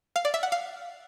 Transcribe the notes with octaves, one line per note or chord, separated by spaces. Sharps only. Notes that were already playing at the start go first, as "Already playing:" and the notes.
F5
D5
E5
F#5
F5